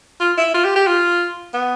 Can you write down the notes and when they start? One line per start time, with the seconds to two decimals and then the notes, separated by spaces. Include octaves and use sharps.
0.20 F4
0.38 E4
0.54 F4
0.65 G4
0.76 G4
0.87 F4
1.54 B3